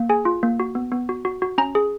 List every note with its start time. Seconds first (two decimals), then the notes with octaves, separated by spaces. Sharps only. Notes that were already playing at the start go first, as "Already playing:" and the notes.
Already playing: A#3
0.09 G#4 G#5
0.25 F4
0.43 A#3
0.60 F#4
0.75 B3
0.92 B3
1.09 F#4
1.25 F#4
1.42 F#4
1.58 C#4 A#5
1.75 G#4